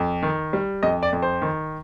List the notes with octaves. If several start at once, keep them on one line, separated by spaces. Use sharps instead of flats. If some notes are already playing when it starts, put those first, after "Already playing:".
Already playing: F2
D#3
G3
F2 D#5
D5
F2
C5
D#3